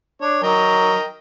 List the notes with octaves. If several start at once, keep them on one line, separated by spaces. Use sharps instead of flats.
D4 C#5
F#3 A#4 D#5 G5